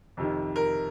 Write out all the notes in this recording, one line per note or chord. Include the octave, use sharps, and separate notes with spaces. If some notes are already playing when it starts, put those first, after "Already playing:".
F2 C3 D#3
A#4